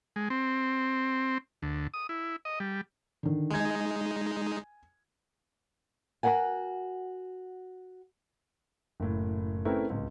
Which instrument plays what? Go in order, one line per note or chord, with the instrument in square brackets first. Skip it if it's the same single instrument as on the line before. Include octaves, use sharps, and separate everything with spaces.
[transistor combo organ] G#3
C4
D2
D#6
E4
D#5
G3
[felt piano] D3 D#3
[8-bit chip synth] G#3 D#4 [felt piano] G#5 G#6
[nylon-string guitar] F#4 A4 A#4 F#5 G#5
[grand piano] F#1 A2
A3 C4 C#4 E4 A#4 B4
D1 C#2